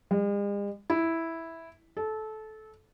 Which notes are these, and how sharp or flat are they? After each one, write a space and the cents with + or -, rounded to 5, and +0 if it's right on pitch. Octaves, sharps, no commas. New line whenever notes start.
G#3 -45
E4 -5
A4 -20